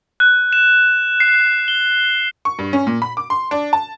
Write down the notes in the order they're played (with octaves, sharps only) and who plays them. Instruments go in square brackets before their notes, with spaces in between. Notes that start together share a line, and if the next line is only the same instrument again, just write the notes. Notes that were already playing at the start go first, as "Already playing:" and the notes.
[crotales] F#6
E7
C7
G7
[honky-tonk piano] C#6
G2
C#4
A#2
B5
D6
C6
D4
A5